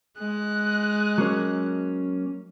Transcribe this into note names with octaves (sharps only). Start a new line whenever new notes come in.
G#3 F#6
F#3 A#3 C#4